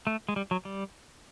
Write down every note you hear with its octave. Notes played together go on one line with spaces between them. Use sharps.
A3
G#3
G3
F#3
G3